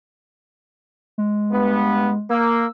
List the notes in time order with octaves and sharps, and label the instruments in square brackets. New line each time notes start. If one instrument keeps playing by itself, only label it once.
[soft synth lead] G#3
[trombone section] G2 B3
[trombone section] A#3 [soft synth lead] E6